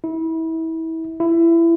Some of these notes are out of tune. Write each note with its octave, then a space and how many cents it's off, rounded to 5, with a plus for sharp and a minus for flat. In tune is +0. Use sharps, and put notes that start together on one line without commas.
E4 -30
E4 +20